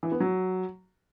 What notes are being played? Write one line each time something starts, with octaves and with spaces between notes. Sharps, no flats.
E3
B3
F#3